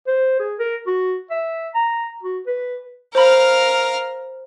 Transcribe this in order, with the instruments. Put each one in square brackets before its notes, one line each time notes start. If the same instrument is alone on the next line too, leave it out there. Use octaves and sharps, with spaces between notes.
[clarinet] C5
G#4
A#4
F#4
E5
A#5
F#4
B4
[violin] A#4 F5 [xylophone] C5 B5